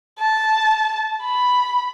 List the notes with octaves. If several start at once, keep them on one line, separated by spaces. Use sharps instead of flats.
A5
B5